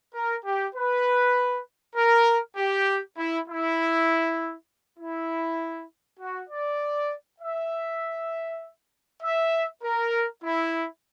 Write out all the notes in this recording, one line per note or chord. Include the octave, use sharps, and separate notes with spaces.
A#4
G4
B4
A#4
G4
E4
E4
E4
F#4
D5
E5
E5
A#4
E4